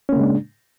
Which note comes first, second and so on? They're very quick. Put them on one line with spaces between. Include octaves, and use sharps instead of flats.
C#4 A#3 C#3 G#3 D4